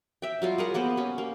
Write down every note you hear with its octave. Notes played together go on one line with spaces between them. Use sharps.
E5 G5
F#3 G3 F4
G#4 A#4 F#5
A#3 B3 G4 C5
C#4 G4
A#3